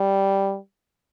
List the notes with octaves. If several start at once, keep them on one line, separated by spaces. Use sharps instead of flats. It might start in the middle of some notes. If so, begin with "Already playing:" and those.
Already playing: G3